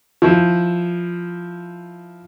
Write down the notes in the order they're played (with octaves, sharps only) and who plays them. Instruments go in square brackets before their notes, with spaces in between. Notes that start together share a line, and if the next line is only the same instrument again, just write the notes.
[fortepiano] F3 E4